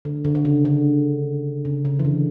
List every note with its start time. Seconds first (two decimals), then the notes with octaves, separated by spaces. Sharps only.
0.05 D3
0.25 D3
0.35 D3
0.45 C#3
0.65 D3
1.65 C#3
1.85 C#3
1.99 E3
2.05 D3